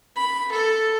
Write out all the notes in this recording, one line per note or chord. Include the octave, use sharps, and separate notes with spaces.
B5
A4